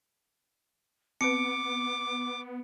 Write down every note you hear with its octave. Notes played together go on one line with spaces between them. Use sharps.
B3 C4 B4 D6 C#7 D7